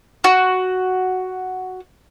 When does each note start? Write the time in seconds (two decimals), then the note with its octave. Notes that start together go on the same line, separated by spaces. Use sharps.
0.24 F#4